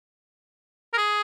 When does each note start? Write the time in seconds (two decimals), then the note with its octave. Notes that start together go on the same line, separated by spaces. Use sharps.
0.93 A#4
0.97 G#4